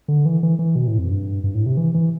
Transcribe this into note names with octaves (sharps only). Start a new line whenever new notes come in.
D3
E3
E3
E3
B2
A2
F2
G2
G2
A2
C3
E3
E3